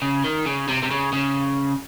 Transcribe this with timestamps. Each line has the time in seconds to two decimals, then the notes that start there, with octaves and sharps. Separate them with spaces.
0.02 C#3
0.24 D#3
0.46 C#3
0.68 C3
0.83 C3
0.91 C#3
1.13 C#3